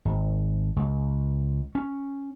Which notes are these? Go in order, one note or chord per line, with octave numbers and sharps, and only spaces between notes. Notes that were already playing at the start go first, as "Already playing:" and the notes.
G#1
C#2
C#4